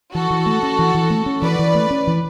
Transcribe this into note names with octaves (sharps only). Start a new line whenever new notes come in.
E3 F#4 A4
E3
A3
C#4
E3
E3
A3
C#4
E3 B4 D5
E3
A3
C#4
E3